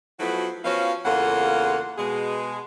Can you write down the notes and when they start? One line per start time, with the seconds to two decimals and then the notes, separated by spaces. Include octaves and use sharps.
0.20 F3 F#3 A3 B3 E4 F#4
0.64 F3 B3 C#4 F#4 F5
1.05 E2 C#3 A#3 F4 A4 F#5
1.98 B2 G#3 G#4